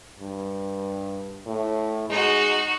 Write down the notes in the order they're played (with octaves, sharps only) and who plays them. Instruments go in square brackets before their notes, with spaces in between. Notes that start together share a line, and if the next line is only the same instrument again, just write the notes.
[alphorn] G2
A2
[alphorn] G#3 [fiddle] D#4 F#4